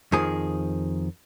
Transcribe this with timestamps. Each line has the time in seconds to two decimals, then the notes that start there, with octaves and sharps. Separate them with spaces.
0.12 F2 D#3 F3 G#4